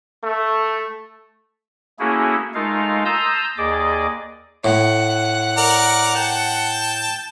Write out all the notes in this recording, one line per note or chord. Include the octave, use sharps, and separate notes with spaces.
A3
A3 A#3 C#4 E4 F#4 G#4
G#3 A3 D#4 F4 A#4 F5
A5 A#5 C6 D#6 E6 G6
D#2 G#4 D5 D#5 D6
A2 F#5
A#4 D5
G5 A5